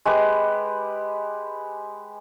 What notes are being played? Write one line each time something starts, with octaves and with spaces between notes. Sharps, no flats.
G#3 G4 B4 D6